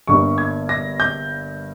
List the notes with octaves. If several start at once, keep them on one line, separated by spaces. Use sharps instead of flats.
G1 G2 G3 A#3 C#6
G#6
A#6
G6